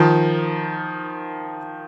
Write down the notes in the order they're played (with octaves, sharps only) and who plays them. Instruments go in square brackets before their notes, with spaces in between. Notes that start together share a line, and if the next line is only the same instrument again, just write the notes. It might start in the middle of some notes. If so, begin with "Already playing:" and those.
Already playing: [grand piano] D#3 F3